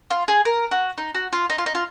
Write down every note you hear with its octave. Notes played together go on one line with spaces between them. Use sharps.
F4
G#4
A#4
F#4
D#4
F#4
F4
D#4
F4
D#4
F4